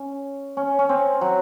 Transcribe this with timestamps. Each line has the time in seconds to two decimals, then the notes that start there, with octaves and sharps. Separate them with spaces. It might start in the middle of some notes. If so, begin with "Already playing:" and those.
Already playing: C#4
0.57 C#4
0.79 C#4
0.89 C4
1.21 F#3